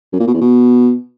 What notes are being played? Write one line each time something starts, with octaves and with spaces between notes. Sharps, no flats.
F#2
A#2
B2
E2
B2